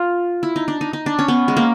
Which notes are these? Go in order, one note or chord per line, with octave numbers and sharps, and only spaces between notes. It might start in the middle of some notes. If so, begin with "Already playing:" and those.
Already playing: F4
E4
D#4
D4
D#4
D#4
D4
C#4
B3
G#3
A#3